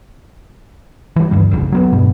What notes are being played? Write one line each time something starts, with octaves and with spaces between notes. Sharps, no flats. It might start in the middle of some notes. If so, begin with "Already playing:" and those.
E3 G3
D2 G2 G3
F1 A#1 F2 C#3
F#3 A#3 B3
F1 G2 B2 G3